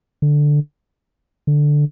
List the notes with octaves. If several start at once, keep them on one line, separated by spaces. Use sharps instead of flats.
D3
D3